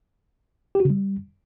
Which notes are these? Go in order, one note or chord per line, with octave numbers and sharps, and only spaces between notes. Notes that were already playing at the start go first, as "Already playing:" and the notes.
G4
F#4
C#3
G3